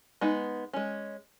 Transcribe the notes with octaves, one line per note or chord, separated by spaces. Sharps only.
G#3 B3 D#4
G#3 C#4